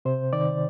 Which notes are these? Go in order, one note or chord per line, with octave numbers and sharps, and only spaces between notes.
C3 C5
D#3 D5